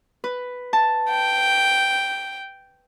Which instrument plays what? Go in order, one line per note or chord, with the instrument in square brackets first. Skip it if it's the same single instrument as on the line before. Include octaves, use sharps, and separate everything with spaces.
[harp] B4
A5
[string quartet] G5